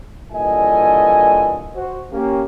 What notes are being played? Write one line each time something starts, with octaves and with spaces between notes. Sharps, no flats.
G2 A#2 E3 A4 D#5 G#5
F#4 C5
A#3 C#4 G4